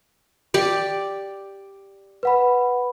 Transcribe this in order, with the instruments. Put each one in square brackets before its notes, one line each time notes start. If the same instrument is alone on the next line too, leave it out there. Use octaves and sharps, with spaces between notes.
[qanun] G4 D5
[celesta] B4 F#5 B5